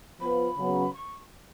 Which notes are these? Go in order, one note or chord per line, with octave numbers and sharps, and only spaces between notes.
F3 B3 F4 B4 B5
C#3 F#3 B3
C#6